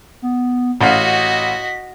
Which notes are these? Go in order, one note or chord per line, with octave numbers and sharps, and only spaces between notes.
B3
A1 F#4 D#5 F5 B6